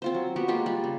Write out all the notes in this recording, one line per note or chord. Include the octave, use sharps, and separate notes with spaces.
C4 F4 C5
F#3
B3 F#4 G4
G#3 A#3 F4 G4
G3
C#3